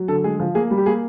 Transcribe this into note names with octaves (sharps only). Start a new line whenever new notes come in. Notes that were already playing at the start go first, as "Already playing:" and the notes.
Already playing: F#3
D3 A4
G#3 G#4
F3
A#3 G#4
G3
G4
A#3 G#4